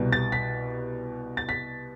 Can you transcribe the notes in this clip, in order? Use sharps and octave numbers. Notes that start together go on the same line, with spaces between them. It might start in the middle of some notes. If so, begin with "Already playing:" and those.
Already playing: C2 B2 G3
A6
B6
A6
B6